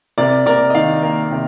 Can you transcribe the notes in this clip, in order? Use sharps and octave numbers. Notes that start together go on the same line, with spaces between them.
C3 A#4 D5
C3 A#4 D5
D#5
D#3 D5 F5
A#3
C3